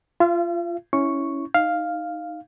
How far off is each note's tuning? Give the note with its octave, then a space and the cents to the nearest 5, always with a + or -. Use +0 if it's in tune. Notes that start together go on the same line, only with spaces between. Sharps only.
F4 -15 F5 -45
C#4 +0 E4 -10 C#6 +0
D#4 +0 F5 +0